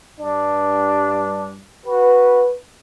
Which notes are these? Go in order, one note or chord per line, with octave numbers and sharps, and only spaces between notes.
G2 D4
F#4 B4